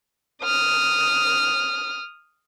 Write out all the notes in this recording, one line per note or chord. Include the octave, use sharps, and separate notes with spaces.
D#6 F6